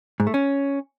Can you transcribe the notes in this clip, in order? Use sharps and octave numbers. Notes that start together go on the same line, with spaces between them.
G#2
A3
C#4